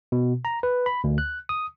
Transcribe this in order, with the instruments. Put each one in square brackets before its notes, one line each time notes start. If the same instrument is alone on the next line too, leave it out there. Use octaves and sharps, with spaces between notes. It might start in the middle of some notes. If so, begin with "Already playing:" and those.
[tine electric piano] B2
A#5
B4
B5
D2
F#6
D#6